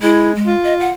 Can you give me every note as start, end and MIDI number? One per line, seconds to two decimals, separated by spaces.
0.02 0.34 56
0.02 0.34 64
0.35 0.55 56
0.47 0.93 65
0.64 0.74 75
0.80 0.91 78